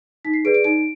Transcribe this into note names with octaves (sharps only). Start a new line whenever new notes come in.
D#4 B6
C7
G#4 B4 D5 D7
D7
D#4 D7